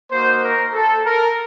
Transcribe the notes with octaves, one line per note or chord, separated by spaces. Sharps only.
A#3 D#4 F#4 C5
A#4
A4
A#4